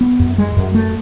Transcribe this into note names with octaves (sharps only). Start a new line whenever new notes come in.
B3
F#2
G#3
F#2
A3